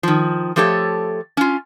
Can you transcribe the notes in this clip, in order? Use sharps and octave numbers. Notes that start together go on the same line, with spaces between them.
D#3 F3
F3 A3 G4 A4 C#5
C#4 F4